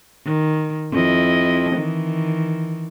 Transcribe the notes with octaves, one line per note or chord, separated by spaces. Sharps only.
D#3
F2 E4 D#5
D#3 E3